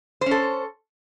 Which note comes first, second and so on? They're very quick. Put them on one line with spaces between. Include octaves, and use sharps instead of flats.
C5 C#4 A4